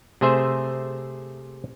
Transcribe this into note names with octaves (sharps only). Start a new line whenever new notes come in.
C3 A3 G#4 C5 E5